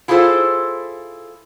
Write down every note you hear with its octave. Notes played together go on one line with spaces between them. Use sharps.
E4 F4 G#4 A4 C5